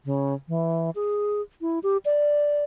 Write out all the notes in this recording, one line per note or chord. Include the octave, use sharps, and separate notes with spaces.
C#3
E3
G#4
E4
G4
D5